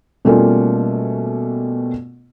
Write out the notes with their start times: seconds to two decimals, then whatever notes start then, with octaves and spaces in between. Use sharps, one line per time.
0.25 B2 G3 A3 A#3 C#4 F4